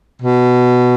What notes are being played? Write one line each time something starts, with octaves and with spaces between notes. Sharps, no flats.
B2